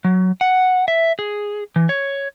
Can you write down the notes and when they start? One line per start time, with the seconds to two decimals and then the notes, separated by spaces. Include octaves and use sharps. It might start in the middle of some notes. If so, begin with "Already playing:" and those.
0.04 F#3
0.41 F#5
0.88 E5
1.19 G#4
1.76 E3
1.89 C#5